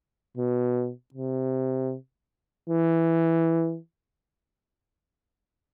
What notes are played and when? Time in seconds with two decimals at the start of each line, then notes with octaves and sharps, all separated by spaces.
0.37 B2
1.15 C3
2.70 E3